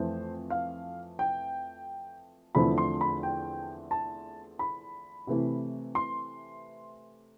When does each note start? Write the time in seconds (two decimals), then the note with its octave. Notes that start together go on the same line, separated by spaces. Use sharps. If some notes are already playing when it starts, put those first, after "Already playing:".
Already playing: F2 E3 A3 C5
0.50 F5
1.19 G5
2.55 E2 D3 F3 A3 C4 B5
2.78 C6
3.01 B5
3.23 G5
3.91 A5
4.59 B5
5.27 C3 E3 A3
5.95 C6